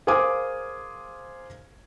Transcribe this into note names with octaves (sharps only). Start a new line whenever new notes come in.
G#4 A#4 C5 F5 D6 D#6